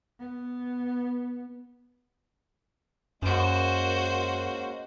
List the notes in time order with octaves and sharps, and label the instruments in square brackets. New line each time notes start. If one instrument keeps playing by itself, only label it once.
[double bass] B3
[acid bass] F#2 [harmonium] G#3 A#3 C#4 [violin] F#4 C5